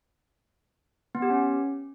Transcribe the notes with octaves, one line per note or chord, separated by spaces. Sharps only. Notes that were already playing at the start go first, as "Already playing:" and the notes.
B3
G4
C#4